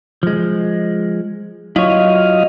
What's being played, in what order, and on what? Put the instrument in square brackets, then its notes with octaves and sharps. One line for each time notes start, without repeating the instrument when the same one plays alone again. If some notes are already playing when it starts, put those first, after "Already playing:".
[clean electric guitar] F3 G#3
[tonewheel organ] F#3 D#5 F5 [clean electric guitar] E4 F4 C#5